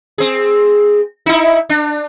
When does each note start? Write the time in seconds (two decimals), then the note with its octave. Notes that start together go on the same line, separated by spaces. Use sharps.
0.18 C4 G#4
1.26 D#4 E4
1.69 D4